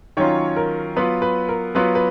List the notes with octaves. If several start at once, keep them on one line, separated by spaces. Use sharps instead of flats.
D#3 F#3 C#4 F4 C#5
A#4
F#3 B3 F4 B4
B4
A#4
F#3 B3 F4 B4
B4